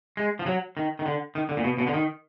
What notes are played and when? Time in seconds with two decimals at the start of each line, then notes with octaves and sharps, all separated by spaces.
0.17 G#3
0.39 F3
0.46 F#3
0.77 D#3
0.99 D#3
1.06 D3
1.35 D#3
1.49 D3
1.57 A#2
1.64 B2
1.78 B2
1.87 D3
1.94 D#3